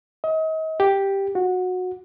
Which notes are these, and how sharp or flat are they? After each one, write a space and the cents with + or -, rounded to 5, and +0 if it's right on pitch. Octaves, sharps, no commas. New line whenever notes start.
D#5 +35
G4 +0
F#4 -20